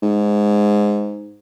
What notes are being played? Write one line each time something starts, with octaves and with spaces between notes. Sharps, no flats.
G#2